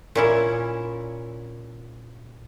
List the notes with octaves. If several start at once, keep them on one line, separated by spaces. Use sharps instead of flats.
A#2 C#4 E4